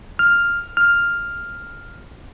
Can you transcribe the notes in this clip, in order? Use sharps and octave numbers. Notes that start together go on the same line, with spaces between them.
F6
F6